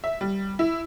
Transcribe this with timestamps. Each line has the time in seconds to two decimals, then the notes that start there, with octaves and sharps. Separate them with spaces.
0.04 E5
0.21 G3
0.59 E4